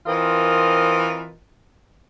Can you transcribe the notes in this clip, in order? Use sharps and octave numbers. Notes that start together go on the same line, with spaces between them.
E3 C4 F4 A#4 D#5